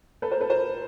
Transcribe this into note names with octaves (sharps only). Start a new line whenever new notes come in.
A4 B4
A#4 C5
A4 B4
A#4 C5